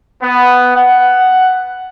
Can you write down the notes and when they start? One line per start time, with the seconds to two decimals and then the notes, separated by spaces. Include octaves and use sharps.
0.22 B3
0.75 F#5